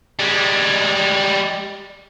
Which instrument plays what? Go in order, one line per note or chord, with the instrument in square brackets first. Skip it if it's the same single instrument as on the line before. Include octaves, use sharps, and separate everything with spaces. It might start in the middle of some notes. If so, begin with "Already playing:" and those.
[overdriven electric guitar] G3 G#3